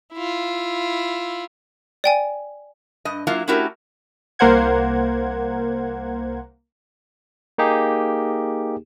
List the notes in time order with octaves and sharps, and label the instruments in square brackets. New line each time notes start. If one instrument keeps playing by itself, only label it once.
[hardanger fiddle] E4 F4
[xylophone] D5 G5 G#5
[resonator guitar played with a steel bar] G2 D#5
F#3 A#3 E4 F4
A3 C#4 E4 F#4 G4 A#4
[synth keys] C2 A#3 A#4 C5 F#5 G#6
[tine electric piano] A#3 D#4 G4 G#4